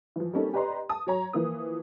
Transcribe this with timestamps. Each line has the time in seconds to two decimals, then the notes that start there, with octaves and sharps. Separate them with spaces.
0.16 E3 F3
0.33 G3 A#3 C4 C#4 D#4 A4
0.54 G4 B4 D5 D#5 A#5 C6
0.89 A5 D#6
1.07 F#3 C#5 A#5
1.33 E3 F3 A#3 D#6